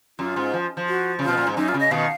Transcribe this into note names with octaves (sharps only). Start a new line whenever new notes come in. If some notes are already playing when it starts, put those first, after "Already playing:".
F#2 F4
G#2
F3
F3
F#4
C#3
B2 F4
A#2
G#2
F#2 D#4
F4
C#3
D#5
B2 D#3 F5